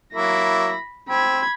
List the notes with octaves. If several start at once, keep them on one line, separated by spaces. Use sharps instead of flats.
F#3 A#3 E4 B5 A#6
C4 B5 G#6